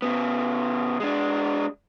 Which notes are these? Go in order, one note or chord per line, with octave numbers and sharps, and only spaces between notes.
C#3 B3
G#3 D4